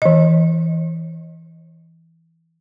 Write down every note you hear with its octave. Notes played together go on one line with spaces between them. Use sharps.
E3 D#5